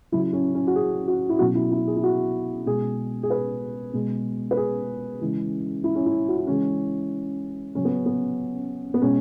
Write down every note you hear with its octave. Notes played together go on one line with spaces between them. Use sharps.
C#3 F#3 E4
C#4
C#4
F#4
G#4
F#4
E4
B2 F#3 F#4
E4
E4
G#4
E4
F#4
B2 G#3 G#4
G#4
B4
B2 G#3
B4
G#4
C#3 E3 G#3
E4
C#4
E4
F#4
E4
C#3 E3 G#3 C#4
C#3 F#3 C#4
B3
B3
B3
B2 G#3 C#4